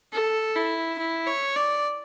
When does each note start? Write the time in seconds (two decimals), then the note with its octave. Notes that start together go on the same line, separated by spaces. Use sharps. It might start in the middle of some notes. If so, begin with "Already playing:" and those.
0.13 A4
0.55 E4
0.99 E4
1.26 C#5
1.56 D5